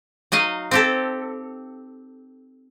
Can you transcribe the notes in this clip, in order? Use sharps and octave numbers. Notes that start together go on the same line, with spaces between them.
F#3 D#4 D#5 F5
C4 G4 A4